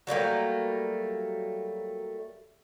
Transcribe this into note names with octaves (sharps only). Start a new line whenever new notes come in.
F#3 G3 A3 A#3